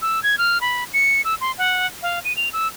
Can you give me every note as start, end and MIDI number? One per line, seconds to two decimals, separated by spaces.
0.02 0.22 88
0.23 0.35 92
0.38 0.61 89
0.61 0.84 83
0.93 1.21 97
1.25 1.35 88
1.41 1.52 84
1.58 1.87 78
2.03 2.19 77
2.25 2.35 99
2.37 2.49 101
2.53 2.68 88